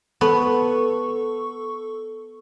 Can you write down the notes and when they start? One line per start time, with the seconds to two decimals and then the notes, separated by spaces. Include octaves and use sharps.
0.21 B3 A4 C#6